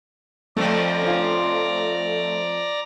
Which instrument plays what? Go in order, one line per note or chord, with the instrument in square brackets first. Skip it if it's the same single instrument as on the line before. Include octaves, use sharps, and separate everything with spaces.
[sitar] F2 F3 C4 [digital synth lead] A3 [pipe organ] D5 A#5
[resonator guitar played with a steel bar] C#4 F4